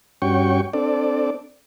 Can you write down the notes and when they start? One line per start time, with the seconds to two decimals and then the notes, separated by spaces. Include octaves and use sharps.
0.22 G2 C#4 F#4 G5 C#6
0.73 C4 D4 A4 D5